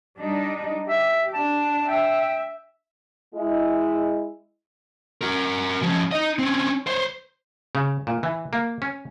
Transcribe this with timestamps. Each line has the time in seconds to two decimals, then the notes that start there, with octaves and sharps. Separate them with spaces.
0.18 G3 D4 D#4
0.88 G4 E5
1.34 D4 A5
1.88 E5 G5
3.34 G#3 E4
5.21 F#4 A#4
5.82 F3 C#4
6.12 D#4 D#5
6.39 C4 C#4
6.87 C5 C#5
7.75 C#3
8.07 A#2
8.23 E3
8.53 A#3
8.82 C#4